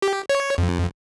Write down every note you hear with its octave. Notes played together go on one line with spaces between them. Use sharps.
G4
C#5
F2